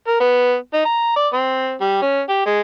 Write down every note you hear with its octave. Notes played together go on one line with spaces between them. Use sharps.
A#4
B3
D#4
A#5
D5
C4
G3
C#4
G4
G#3